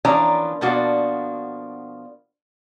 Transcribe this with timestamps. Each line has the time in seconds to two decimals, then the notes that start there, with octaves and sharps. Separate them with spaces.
0.05 E3 F3 A#3 C#4 D4 A#5
0.61 B2 F3 A#3 D4 F#4